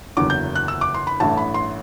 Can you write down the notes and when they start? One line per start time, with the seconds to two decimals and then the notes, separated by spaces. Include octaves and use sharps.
0.17 F#1 E2 D3 F#3 D6
0.30 G6
0.56 F#6
0.68 E6
0.81 D6
0.94 C6
1.07 B5
1.20 A1 G2 E3 A3 A5
1.37 B5
1.54 C6